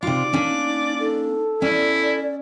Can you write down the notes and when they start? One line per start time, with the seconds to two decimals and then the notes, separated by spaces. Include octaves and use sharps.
0.03 C3 D#4 F4 D5
0.33 A#3 C#4 D4
1.00 D#4 A4
1.62 C#4 E4 D5